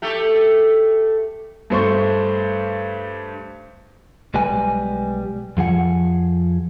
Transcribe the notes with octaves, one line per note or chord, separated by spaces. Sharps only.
A3 G4 A4
G2 A3 C5 C#6
B1 G3 G#3 B4 G#5
F2 F3 G#4 F#5